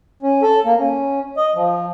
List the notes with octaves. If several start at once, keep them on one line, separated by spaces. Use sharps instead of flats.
C#4
A4
A#3
C#4
D#5
F3